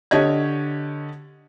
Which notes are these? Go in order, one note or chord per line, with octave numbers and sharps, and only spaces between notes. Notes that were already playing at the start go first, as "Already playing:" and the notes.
D3 G4 C#5 D#5 G#6